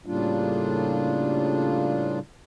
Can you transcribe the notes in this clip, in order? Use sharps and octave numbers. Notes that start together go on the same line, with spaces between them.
A2 C#3 G3 A#3 D4 F4